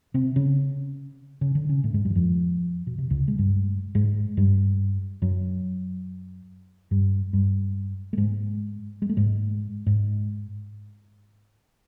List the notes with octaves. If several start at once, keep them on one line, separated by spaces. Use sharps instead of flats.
C3 C4
C#3 C#4
C#3 C#4
D3 D4
C#3 C#4
A2 A3
G#2 G#3
G2 G3
E3
F2 F3
B2
C3
C#2 C#3
G#3
G2 G3
G#2 G#3
G2 G3
F#2 F#3
G2 G3
G2 G3
A3
G#2 G#3
G#3
A3
G#2 G#3
G#2 G#3